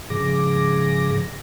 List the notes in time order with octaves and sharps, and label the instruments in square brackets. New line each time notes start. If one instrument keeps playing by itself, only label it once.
[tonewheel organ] G#2 C#3 F3 G#4 D6 A#6